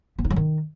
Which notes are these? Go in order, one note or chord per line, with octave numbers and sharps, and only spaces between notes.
B3
D#4
F#3
D#3